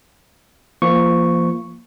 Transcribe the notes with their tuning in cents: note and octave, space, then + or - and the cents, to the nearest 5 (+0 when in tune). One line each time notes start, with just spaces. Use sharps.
F3 -30 A#3 +0 C#6 +0